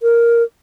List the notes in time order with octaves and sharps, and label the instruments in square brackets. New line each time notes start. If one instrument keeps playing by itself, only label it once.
[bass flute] A#4